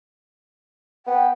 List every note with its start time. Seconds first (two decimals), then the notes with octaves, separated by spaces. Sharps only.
1.06 B3 G5